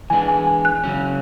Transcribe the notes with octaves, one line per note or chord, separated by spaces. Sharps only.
E3 G#3 B3 D4 G#5
G#5
G#5
F#6
C#3 F#3 C#4